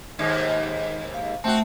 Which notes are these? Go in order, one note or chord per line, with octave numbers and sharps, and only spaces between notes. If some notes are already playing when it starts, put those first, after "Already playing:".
D#2 G#2 A#3
F5
A3 C4 F#4 E5